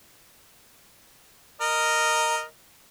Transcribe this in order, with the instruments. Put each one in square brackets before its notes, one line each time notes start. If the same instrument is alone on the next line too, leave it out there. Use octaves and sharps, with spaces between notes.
[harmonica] A#4 D#5